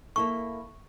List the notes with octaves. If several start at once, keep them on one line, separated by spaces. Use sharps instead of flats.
A#3 E4 A4 C#6